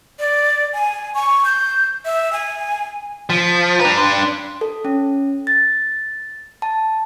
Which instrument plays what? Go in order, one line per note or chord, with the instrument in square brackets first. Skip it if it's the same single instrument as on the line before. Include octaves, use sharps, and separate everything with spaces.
[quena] D5
G#5
C#6
G6
E5
G#5
[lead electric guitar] F3 [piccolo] B6
[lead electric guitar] D4 B4 [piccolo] A#5
[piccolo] C6
[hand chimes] A4
C#4
A6
A5